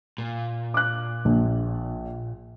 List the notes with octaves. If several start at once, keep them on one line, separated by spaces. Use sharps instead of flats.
A#2
D6 F#6
A#1